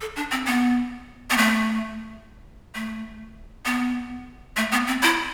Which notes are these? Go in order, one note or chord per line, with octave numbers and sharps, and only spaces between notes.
A4
D4
C4
B3
B3
A3
A3
B3
A3
B3
C4
E4